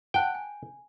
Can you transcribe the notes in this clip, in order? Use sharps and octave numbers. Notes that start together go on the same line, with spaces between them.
F#5 G5 A5 F#6
G#5